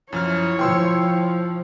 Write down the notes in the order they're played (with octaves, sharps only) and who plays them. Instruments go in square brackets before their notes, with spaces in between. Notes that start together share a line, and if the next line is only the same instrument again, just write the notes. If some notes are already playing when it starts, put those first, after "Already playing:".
[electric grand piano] F#2 F3 F6 [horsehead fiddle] E4 C#5
[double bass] F3 [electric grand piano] G5 C6 E6